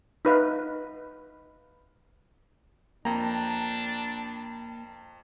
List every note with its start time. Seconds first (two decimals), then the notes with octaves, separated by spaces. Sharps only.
0.25 D#4 B4 F5
3.05 F2 A#3 D4 G5 A#5